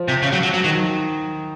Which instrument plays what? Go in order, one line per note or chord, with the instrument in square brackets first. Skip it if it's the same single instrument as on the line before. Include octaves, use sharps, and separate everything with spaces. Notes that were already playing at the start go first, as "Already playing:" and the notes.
Already playing: [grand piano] F3
[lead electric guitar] C3
C#3
F#3
F#3
F#3
[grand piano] D#3 [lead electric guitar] F#3